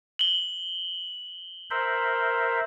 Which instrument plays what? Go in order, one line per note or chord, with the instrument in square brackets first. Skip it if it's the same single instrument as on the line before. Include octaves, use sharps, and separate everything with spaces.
[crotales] F#7 G7
[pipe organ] A#4 C5 E5